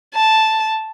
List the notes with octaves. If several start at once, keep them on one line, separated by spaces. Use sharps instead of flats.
A5